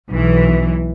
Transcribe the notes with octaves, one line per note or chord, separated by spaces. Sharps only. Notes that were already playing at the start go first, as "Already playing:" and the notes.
B1 E3